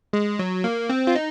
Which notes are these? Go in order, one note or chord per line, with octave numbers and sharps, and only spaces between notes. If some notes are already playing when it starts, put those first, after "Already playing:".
G#3
F#3
A#3
C4
F4
D#4